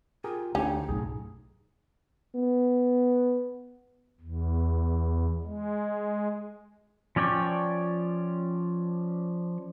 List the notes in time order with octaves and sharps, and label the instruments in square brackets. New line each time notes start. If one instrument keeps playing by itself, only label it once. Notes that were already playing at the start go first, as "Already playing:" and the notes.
[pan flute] F4 [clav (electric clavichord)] G4 G#4 A#4
[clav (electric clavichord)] D2 [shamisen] C#4 G4 [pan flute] D#4
[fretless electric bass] B1 F#2 A2 [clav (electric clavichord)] G#4
[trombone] B3
[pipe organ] E2
G#3
[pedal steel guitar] F3 C#4 D5 G5 C#6